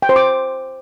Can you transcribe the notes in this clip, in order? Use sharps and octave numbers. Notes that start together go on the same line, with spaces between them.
G5
C5
D6